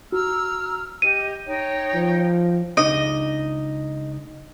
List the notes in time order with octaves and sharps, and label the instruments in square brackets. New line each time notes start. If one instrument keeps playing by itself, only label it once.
[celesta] F#4 [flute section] A#5 E6 F6
[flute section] G4 D#5 [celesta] D#7
[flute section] D#4 C#5 G5
[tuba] F3
[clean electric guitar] C#2 D4 D#4 [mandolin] D#5